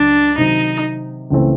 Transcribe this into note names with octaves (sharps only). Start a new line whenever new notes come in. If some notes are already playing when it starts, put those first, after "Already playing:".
Already playing: C#2 F#3 D4
C3 D#3 F#3 D#4
C#2 C#3 E3 A3 C4